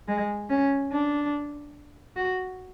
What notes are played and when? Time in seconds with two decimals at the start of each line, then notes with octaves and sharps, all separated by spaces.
0.08 G#3
0.50 C#4
0.92 D4
2.16 F#4